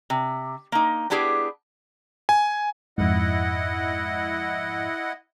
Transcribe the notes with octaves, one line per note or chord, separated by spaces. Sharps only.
C3
A#3 D#4
B3 D4 E4 G4 G#4
G#5
F2 G#2 E4 D#5 F#5